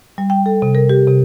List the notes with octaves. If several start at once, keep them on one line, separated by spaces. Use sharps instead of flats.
G3
G5
A4
C3
A#4
G4
C3